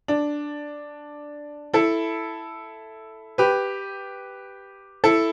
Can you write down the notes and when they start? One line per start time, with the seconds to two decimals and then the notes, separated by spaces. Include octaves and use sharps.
0.08 D4
1.74 E4 A4
3.38 G4 B4
5.04 E4 A4